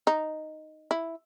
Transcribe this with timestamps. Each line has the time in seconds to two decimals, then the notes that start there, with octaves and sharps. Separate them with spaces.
0.07 D#4
0.91 E4